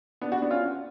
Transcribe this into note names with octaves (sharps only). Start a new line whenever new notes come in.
B3 D4
D4 F#4
B3 D4
C#4 F4